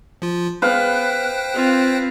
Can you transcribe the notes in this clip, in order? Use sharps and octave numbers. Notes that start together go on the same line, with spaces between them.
F3 F4
B3 B4 C5 F5 G5 F#6
C4 F4